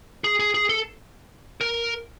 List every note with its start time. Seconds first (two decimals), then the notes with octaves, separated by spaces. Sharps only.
0.24 G#4
0.40 G#4
0.54 G#4
0.69 A4
1.61 A#4